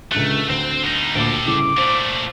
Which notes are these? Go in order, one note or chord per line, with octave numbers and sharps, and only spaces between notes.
C#2 D3 A3 F#6
D2 C4
B2 D#4
D2 A#2 A4 G5 D6
G1 A2 C#3 D6
A#2 A3 C5